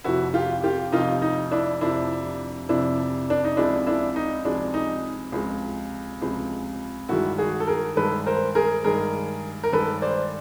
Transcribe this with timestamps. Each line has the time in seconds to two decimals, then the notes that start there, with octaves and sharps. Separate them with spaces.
0.04 F1 F2 C3 F3 E4 F#4
0.34 F4 G4
0.64 F4 G4
0.92 F1 F2 C3 F3 D#4 F4
1.22 D#4
1.52 D4 E4
1.81 F1 F2 C3 F3 D4 E4
2.69 F1 F2 C3 F3 D4 E4
3.30 D4
3.44 D#4
3.57 C#2 C3 F3 G#3 D4 E4
3.87 D4 E4
4.16 D#4
4.45 C#2 C3 F3 G#3 D4
4.74 D#4
5.32 C#2 C3 F3 G#3
6.21 C#2 C3 F3 G#3
7.09 G2 D#3 G#3 E4 F#4
7.38 F#4 G#4
7.60 A4
7.67 G#4 A#4
7.97 G2 D#3 G#3 A4 B4
8.26 A#4 C5
8.55 G#4 A#4
8.84 G2 D#3 G#3 G#4 A#4
9.64 A#4
9.72 G2 D#3 G#3 A4 B4
10.02 C5 D5